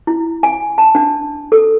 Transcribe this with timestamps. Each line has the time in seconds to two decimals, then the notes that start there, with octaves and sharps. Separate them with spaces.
0.07 E4
0.43 G#5
0.78 A5
0.95 D4
1.52 A4